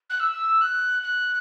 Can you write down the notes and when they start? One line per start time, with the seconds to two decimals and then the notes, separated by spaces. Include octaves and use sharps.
0.10 F#6
0.20 E6
0.61 F#6
1.03 F#6